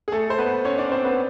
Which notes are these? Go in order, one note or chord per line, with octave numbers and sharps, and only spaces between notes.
G#4
A3 A4
C5
B3 B4
C#4 C#5
D4 D5
C4 C5
B3 B4